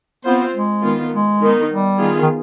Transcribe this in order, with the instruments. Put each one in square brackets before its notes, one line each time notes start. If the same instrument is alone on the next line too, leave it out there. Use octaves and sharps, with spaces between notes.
[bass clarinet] B3 [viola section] C4 F4 C5
[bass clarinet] G#3
[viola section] D#3 B3 F4
[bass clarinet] G#3
[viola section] D#3 B3 D#4
[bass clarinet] G3
[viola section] D#3 B3 F4 G#4
[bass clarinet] D#3